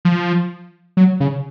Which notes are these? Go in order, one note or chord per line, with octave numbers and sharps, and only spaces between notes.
F3
F#3
C#3